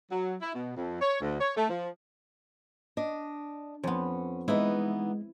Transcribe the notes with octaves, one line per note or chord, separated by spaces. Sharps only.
F#3
E4
B2
F2
C#5
D2
C#5
A3
F3
D4 D#5
F2 B3 C#4
E3 G#3 B3 D#4 E4